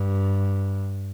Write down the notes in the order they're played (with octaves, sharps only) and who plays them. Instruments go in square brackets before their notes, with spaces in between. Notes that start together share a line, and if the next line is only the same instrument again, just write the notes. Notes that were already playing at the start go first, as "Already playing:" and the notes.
Already playing: [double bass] G2